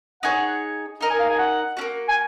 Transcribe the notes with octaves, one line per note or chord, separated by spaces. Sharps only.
D#4 G#4 C#5 F#5
D#4 A#4 D#5 A#5
G#5
F5
G#5
F#5
A#3 C#4 F#4
G#5